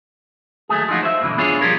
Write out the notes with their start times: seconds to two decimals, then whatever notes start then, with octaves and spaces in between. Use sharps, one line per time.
0.69 D#2 F#3 A3 G#4
0.89 F3 F#3 D#4 F4 F#4
1.03 C5 E5
1.21 G2 B2 D3 E3
1.37 B3 D4 F4 G#4 C#5
1.61 B1 C3 F3 G3 G#4 A#4